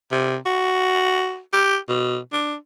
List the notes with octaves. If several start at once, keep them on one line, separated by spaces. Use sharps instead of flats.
C3
F#4
G4
B2
D4